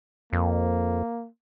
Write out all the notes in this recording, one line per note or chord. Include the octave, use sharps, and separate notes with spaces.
F2 A#3